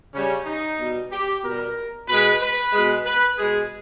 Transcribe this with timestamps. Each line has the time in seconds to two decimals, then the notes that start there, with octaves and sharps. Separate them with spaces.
0.14 C#3 G3 C#4
0.46 D#4
0.79 B2 G3
1.12 G4
1.43 B2 G3 A#4
2.09 B2 G#3 B4
2.41 B4
2.73 B2 G#3
3.05 B4
3.37 B2 G#3 G#4